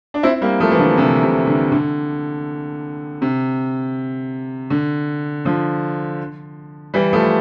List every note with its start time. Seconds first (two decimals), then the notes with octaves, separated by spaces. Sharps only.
0.14 D4
0.23 C4 E4
0.41 G3 A#3
0.60 F3 A3
0.71 E3
0.79 D3 F3
0.97 C3 E3
1.23 C3
1.47 D3
1.72 D3
3.22 C3
4.70 D3
5.45 D3 F3
6.94 E3 G3
7.13 F3 A3